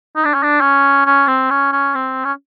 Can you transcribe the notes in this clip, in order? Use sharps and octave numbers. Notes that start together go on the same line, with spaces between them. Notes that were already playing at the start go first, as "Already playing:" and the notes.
D#4
D4
C#4
D4
C#4
C#4
C4
C#4
C#4
C4
C#4